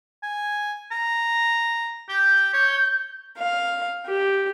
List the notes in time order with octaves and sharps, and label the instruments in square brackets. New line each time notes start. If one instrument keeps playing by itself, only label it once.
[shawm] G#5
A#5
[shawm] G4 [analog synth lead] G6
[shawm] C#5
[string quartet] F5
G4